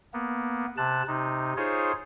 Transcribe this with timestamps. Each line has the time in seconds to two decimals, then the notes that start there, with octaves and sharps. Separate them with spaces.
0.13 A#3 B3
0.77 C3 A5 F#6
1.08 C3 D#4
1.57 D#4 F4 G#4 C5 C#5